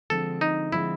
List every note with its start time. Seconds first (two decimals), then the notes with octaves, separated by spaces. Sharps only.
0.10 D3 F3 G#3 C4 A4
0.41 D#4
0.72 D3 F3 G#3 C4 E4